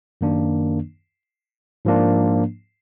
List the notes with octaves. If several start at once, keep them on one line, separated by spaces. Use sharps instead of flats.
F#2 D#3 A#3 D4
G#2 F3 A#3 D4